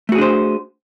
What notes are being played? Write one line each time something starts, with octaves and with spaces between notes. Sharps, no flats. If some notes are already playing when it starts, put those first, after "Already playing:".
A3 D4 F#4 G#4 C5